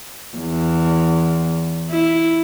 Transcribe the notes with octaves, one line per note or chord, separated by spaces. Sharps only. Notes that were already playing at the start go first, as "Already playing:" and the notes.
E2
E4